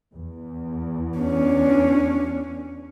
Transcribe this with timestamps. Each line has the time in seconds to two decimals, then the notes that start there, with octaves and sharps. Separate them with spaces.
0.14 E2
1.18 C#4 D4